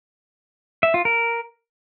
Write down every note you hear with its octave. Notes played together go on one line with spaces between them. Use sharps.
E5
F4
A#4